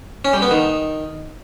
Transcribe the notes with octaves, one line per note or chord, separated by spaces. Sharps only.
C#4
G3
B3
D#3